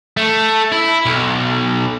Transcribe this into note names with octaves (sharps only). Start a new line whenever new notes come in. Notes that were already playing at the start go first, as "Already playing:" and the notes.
A3
E4
B1